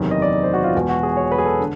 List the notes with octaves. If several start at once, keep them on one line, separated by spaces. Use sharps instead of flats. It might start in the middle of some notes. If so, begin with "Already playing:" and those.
Already playing: F#1 E2 C3 D#3
D#5
D5
C5
F#4
F4
E1 E2 B2
F#4
G#4
C#5
B4
G#4
A4
D3